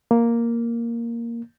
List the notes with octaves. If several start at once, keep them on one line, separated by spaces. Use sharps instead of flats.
A#3